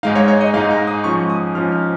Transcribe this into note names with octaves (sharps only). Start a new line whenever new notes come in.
G#2 G#3 D#4 F5
C#5
C#5
D#5
G#2 G#3 D#4 F5
A#5
D#6
G#2 F3 C#4 C#6
D#6
G#2 F3 C#4 F6
F6